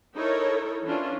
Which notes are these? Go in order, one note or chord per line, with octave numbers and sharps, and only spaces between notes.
D#4 E4 A4 A#4 C#5
E3 C#4 D4 F4